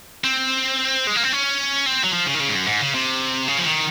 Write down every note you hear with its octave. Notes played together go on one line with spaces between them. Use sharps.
C4
G#3
A#3
C4
C#4
C4
F#3
F3
C#3
D#3
C#3
G#2
F#2
G#2
C#3
C3
C#3
F3
D#3